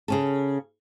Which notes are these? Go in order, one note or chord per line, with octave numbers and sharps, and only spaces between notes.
C#3 C#4 A4